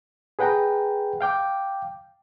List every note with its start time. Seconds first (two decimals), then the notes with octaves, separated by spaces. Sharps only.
0.39 G#4 B4 F#5 G5 A#5
1.21 F5 G5 D6